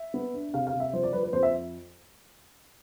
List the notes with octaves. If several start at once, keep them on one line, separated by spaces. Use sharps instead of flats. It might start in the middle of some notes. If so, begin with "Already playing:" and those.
Already playing: E5
B3
D4
C3 F5
F5
C3
E5
F3 C5
D5
F3 B4
B4
F2 C5
E5